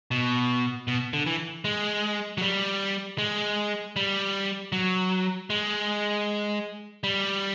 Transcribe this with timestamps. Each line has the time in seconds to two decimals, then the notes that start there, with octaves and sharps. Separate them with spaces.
0.11 B2
0.88 B2
1.13 D3
1.26 E3
1.65 G#3
2.38 F#3
2.42 G3
3.18 G#3
3.96 G3
4.72 F#3
5.50 G#3
7.04 G3